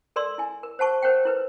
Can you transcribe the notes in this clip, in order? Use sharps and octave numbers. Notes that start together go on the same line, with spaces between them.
A4 A#4 D5 C6 E6
E4 G#5
A#4
C5 F#5 A5 C#6
A#4 C5 C#5 F#5 G5
E4 A#4 B4